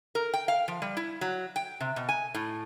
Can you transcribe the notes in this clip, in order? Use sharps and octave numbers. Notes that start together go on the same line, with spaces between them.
A#4
G5
F5
F3
G3
E4
F#3
G5
C3
B2
G#5
A2